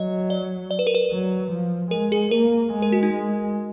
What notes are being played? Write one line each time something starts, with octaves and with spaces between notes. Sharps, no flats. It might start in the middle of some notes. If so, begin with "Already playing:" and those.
Already playing: F#3 D#5
D5
D5
B4
A#4
B4
F#3
F3
G#3 A#4
G#4
A#3 A#4
G#3
A#4
F#4
D#4
G#3